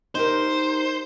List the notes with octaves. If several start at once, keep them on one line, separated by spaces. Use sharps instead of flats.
D#4 G4 A#4 C5